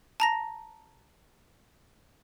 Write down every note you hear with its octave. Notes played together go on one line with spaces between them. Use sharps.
A5 A#5 A#6